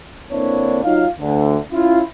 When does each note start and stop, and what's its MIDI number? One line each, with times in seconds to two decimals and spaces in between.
0.31 0.81 50
0.31 0.81 58
0.31 0.81 60
0.31 0.81 62
0.31 0.81 64
0.31 0.81 73
0.84 1.07 54
0.84 1.07 63
0.84 1.07 65
0.84 1.07 77
1.20 1.58 38
1.20 1.58 50
1.72 2.01 61
1.72 2.01 64
1.72 2.01 65